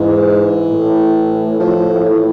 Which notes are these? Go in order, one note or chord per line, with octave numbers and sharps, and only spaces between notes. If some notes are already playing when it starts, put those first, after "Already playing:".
Already playing: G#2 E3
A2
F3
E3